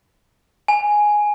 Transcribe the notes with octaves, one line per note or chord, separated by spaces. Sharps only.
G#5